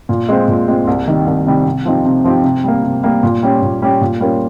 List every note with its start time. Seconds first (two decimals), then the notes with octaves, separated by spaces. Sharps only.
0.09 A#2
0.29 G#3 C4 F4 C5
0.48 A#2
0.68 G#3 C4 F4 C5
0.87 C2
1.07 C3 D#3 G3
1.26 C2
1.47 C3 D#3 G3
1.66 C3
1.85 F3 C4 D#4 G4
2.05 C3
2.24 F3 C4 D#4 G4
2.44 C3
2.64 G3 A#3
2.83 C3
3.03 G3 A#3
3.23 A#2
3.43 G3 C#4 G4
3.62 A#2
3.82 G3 C#4 G4
4.01 A#2
4.20 G3 C#4 F4 A#4